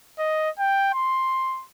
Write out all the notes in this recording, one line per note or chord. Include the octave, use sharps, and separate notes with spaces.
D#5
G5
C6